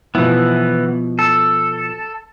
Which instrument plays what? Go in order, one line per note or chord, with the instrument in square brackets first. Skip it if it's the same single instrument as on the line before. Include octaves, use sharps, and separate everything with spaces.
[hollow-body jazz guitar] B2 F3 E4 [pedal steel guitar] E3 B3
[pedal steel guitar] A4